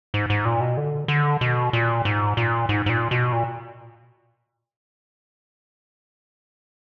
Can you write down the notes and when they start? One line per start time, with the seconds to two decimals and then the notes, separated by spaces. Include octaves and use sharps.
0.14 G#2
0.30 G#2
0.45 A#2
0.61 B2
0.77 D3
1.08 D3
1.41 B2
1.73 A#2
2.05 G#2
2.37 A#2
2.69 G#2
2.86 G#2
2.89 A#2
3.11 B2
3.32 A#2